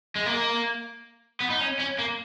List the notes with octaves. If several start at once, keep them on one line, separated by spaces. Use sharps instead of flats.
G#3
A#3
B3
D#4
C#4
C#4
A#3